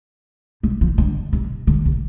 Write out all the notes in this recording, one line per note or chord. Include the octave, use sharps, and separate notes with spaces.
C3
F3
D3
C3
D3
C3